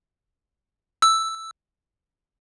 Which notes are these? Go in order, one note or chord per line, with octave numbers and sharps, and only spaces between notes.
E6